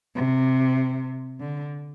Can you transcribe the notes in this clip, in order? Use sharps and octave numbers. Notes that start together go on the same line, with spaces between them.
C3
D3